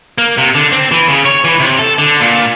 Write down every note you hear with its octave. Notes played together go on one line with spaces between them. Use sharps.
A#3
C3
D3
C4
E3
C#3
C#5
E3
C3
A4
D3
A#2